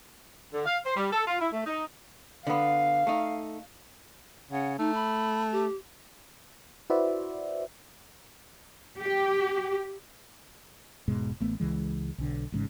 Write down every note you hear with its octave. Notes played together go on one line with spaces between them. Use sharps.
D3
F5
C5
G3
A4
F4
E4
A3
D#4
D3 B3 F5
A3 D#4
C#3 F#5
A3 D#4
B5
G4
E4 F#4 B4 C5 D5 E5
G4
E1 G#2 B2 G#3
A1 A3 B3
C#2 C#3 E3 G#3
B1 D3
A1 G#2 C#3